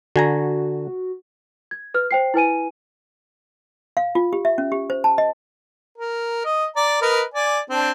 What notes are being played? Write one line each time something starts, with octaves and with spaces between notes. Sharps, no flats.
D3 F#4 G#5 A#5
G#6
B4 F6
C5 G5 C7
E4 B4 G#5 D#7
F5
F4
G4
E5
C#4
G4
C5
A5
D#5
A#4
D#5
D5 A#5
A#4 B4 D#5
D5 G#5
C4 D4